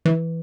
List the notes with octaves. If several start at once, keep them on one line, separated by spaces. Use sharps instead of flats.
E3